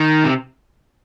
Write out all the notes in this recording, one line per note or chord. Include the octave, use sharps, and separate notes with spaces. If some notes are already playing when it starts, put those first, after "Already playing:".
Already playing: D#3
C3